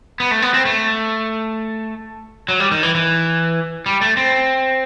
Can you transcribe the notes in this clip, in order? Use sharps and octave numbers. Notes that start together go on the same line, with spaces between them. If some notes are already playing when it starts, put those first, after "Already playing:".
B3
A3
B3
C4
A3
F#3
G3
D#3
E3
E3
G3
A3
C4